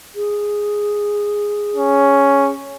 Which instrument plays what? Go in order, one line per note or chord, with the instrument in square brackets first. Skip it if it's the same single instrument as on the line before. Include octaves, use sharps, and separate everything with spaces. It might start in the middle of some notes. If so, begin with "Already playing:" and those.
[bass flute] G#4
[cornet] C#4